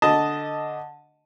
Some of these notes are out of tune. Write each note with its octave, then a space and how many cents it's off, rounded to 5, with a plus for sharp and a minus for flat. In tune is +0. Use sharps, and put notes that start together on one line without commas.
D3 +0 D#5 +0 A5 +0